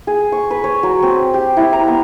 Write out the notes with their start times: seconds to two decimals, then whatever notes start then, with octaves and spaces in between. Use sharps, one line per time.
0.07 G#4
0.32 C#6
0.51 B4
0.64 C#5
0.83 F#3
1.03 C4
1.34 G4
1.57 E4
1.73 A#5
1.88 B3